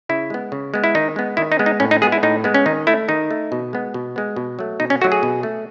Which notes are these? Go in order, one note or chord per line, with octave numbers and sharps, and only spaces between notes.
C#3 E4
G#3 B3
C#3
G#3 B3
E4
D#3 D#4
G#3 B3
D#3 E4
D#4
G#3 B3
D#4
A2 C#4
D#4
G#3 B3 G#4
E4
A2 D#4
G#3 B3
C#4
D#3 D#4
A3 E4
D#3 D#4
A3
B2
G#3 B3
B2
G#3 B3
B2
F#3 A3
B2 D#4
C#4
F#3 A3 F#4
G#4
B2
A3